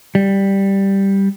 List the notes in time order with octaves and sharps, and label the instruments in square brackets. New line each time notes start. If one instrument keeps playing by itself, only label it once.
[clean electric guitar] G3